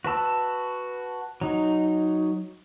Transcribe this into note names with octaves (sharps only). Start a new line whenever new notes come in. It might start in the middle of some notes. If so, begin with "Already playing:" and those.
F#4 B4 A5 E6
F#3 D#4